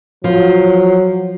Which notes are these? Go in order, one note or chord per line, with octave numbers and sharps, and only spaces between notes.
F3 F#3